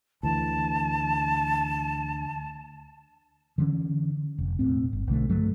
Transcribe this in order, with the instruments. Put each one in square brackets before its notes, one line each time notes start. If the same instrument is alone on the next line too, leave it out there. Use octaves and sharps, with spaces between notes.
[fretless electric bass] D2 E3 [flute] A5
[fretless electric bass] D3 E3 G3 C#4
F1
E1 A#1 A2 C4
G1
B1 D3 A3
G2 F#3 A3